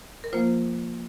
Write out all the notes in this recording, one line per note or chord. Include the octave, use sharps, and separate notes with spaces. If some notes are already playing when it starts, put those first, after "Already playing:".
A#4
F3 A#3 F4 C5